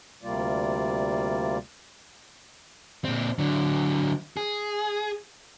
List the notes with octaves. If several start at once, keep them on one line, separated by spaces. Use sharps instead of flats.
D2 C3 G3 A#3 F4 D5
A#2 C4
D3 F#3
G#4